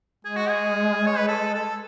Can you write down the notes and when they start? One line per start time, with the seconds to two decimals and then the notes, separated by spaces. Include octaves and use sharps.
0.25 G#3 G#4
0.36 F#4
0.49 G#4
1.07 C#5
1.18 B4
1.27 A4
1.54 A4